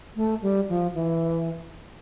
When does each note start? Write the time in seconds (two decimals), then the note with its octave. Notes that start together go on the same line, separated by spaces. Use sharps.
0.16 A3
0.42 G3
0.69 F3
0.94 E3